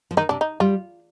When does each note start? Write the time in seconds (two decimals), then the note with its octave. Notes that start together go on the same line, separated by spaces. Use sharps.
0.11 F3
0.17 D#3 D#4
0.29 C3 D4
0.41 D#4
0.60 G3 F4